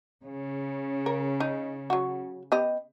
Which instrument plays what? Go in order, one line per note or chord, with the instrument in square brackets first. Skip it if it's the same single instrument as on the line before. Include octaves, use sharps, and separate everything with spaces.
[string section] C#3
[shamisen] A#4
D#4
F#3 F#4
B3 G4 D#5